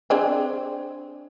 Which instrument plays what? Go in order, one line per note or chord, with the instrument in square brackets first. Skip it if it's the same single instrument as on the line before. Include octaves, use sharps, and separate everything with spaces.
[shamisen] C4 D4 G#4